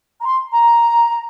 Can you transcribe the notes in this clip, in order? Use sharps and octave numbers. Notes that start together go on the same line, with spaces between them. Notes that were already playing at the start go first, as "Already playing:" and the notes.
A#5
C6
A#5